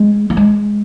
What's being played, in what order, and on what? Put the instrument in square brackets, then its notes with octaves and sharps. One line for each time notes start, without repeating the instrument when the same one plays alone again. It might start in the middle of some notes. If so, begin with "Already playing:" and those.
Already playing: [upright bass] G#3
A#3
G#3